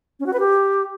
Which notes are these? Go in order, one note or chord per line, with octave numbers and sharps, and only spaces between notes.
C#4
F#4
B4
G4